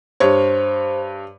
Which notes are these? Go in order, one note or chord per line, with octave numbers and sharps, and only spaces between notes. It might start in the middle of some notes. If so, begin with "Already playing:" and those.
G2 C5 C#5